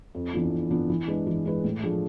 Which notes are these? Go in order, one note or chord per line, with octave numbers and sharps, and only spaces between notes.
F2
E3 B3 D4 F4
F2
E3 B3 D4 F4
E3
G#3 D4 G#4 B4
E3
G#3 D4 G#4 B4
A2
F3 A3 D4 G#4